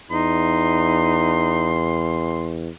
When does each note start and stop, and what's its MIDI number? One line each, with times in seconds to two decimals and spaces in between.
0.11 2.70 40
0.11 1.78 63
0.11 2.48 84